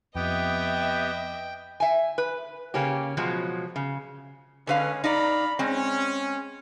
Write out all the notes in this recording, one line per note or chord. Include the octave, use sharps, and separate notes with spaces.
F2 B3 G4 D#5 E5 G5
E5 G#5
B4
C#3 A#3 C#4 G4
B2 F3 F#3 G#3
C#3
D3 G#3 C#4 B4 F5
D#4 D5 F5 A#5 B5
G#3 C4 C#4